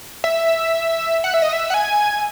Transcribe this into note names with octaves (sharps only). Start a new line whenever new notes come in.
E5
F#5
E5
D#5
E5
F#5
G#5